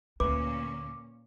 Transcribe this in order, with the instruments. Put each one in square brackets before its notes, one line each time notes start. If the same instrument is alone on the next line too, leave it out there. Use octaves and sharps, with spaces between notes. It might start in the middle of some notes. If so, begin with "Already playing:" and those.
[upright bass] D2 [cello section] A#2 A#3 C#4 [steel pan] B4 [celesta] D6